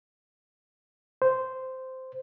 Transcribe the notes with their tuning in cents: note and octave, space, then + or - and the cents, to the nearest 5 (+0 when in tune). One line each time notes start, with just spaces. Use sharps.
C5 -10